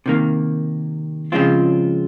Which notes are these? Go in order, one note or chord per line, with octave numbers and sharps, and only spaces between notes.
C3 D#3 A#3
C#3 F3 G#3 C4 F4